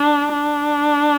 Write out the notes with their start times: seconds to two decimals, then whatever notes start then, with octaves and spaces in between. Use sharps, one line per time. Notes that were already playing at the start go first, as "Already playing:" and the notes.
Already playing: D4
0.33 D4